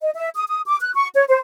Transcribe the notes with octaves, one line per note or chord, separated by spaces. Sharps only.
D#5
E5
D#6
D#6
D6
F#6
C#6
C#5
C5